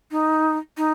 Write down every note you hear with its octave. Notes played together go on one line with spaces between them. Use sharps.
D#4
D#4